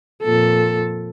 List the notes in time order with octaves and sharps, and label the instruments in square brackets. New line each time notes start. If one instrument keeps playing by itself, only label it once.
[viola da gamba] F2 A#2 A4